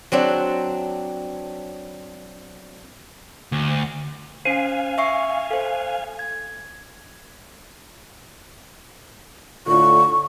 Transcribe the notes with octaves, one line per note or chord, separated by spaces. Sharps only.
F#3 C4 D4
D2
C#4 C5 F5 G#5
E5 C#6 C7
A4 C5
G#6
A2 D3 F4 C#6